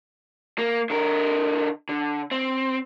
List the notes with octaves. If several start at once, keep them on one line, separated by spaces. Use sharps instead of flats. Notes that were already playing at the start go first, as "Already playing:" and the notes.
A#3
D3 A#4
D3
C4